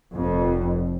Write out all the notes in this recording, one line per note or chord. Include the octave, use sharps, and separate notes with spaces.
F1 F2